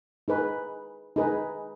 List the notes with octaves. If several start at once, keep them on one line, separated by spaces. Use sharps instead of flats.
D#4 G#4 B4
D#4 G#4 B4